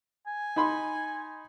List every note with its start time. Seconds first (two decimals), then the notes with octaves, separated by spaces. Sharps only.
0.27 G#5
0.56 D#4 B5 C6